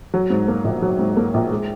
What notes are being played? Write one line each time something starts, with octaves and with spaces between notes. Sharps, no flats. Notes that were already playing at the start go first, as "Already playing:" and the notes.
F#3
G#2
A#3
A#1
F#3
G#2
A#3
A#1
G#3